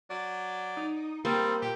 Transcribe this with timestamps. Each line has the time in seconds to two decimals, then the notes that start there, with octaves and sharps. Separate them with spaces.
0.10 F#3 D5
0.77 D#4
1.25 G3 A#3 C4 C5
1.62 A#2 G4